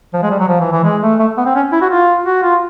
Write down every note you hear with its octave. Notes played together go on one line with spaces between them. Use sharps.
F3
G#3
G3
F#3
F3
E3
E3
G#3
A3
A3
B3
C4
C#4
E4
F#4
F4
F#4
F4